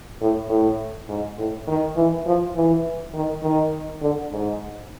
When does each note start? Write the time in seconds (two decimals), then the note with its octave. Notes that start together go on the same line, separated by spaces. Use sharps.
0.21 A2
0.49 A2
1.09 G#2
1.38 A2
1.67 D#3
1.96 E3
2.26 F3
2.55 E3
3.14 D#3
3.43 D#3
4.01 D3
4.32 G#2